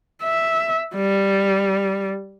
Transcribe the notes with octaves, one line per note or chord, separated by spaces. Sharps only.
E5
G3